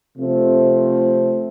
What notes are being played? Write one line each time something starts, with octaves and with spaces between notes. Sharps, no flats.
C3 F3 A3 C4